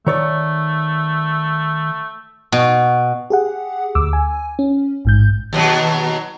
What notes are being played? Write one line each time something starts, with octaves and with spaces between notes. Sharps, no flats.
D#3 A3 C#5 D5
B2
G4 G#4 F#5
D2 D6 E6
G#5
C#4
A1 G#2 G6
D#2 B2 F#3